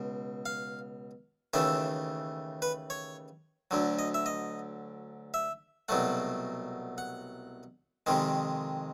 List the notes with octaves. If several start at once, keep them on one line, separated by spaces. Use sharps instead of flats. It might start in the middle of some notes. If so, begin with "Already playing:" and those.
Already playing: C#2 B2
F5
D#2 C#3 E3 A3 E5
B4
C#5
D2 D3 F#3
D#5
E5
D#5
E5
C2 B2 F#3 A3 F#5
F#5
F2 C3 D#3 G#3